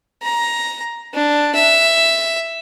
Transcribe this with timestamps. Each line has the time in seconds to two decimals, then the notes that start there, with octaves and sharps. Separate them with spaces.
0.22 A#5
1.14 D4
1.55 E5